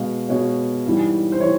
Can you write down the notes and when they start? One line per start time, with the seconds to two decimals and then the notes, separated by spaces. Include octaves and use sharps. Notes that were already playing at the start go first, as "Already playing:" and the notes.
Already playing: B2 G#3 F5
0.29 B2 G#3 C#5
0.85 G#2 E3 G3
1.32 C5
1.41 E3 C#5